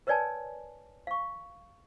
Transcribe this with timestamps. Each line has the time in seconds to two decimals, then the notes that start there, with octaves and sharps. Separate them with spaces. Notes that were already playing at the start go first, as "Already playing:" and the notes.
0.07 A#4 B4 C#5 D5 G#5 A5
1.07 F5 C#6